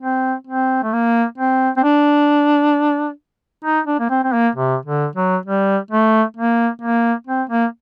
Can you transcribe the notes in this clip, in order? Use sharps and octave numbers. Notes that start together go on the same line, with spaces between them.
C4
C4
A3
A#3
C4
C4
D4
D#4
D4
A#3
C4
C4
A#3
C3
D3
F#3
G3
A3
A#3
A#3
C4
A#3